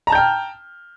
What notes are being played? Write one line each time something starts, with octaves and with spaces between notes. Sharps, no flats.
G5 A5 A#5 F6 G6